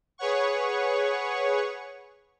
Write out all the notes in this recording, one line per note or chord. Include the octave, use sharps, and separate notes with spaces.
G#4 B4 C#5 F#5 C#6